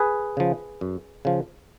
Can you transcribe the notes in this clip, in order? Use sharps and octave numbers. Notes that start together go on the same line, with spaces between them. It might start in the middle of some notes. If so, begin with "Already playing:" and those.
Already playing: G#4 B4
C#3 F3
F#2
C#3 F3